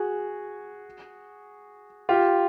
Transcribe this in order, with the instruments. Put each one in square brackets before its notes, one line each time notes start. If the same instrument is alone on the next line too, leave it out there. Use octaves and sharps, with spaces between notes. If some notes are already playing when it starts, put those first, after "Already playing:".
Already playing: [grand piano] F#4 G#4
F4 G4